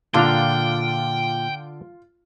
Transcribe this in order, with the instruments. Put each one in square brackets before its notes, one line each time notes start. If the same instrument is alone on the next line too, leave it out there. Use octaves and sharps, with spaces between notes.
[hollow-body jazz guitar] A#2 [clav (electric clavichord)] D3 D4 A#5 [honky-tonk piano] F4 [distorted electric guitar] G5